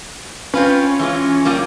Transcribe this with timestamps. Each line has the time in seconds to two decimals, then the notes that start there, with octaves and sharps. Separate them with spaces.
0.54 C4 C#4 F4 B4
0.99 E3 G#3 F4
1.45 G3 A#3 F4